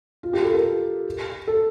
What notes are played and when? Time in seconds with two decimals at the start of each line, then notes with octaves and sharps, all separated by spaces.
0.23 F4
0.33 G4
0.44 A4
0.54 A#4
1.47 A4